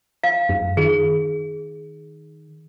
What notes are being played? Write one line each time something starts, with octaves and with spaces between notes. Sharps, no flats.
F5
F#2
D#3 G#4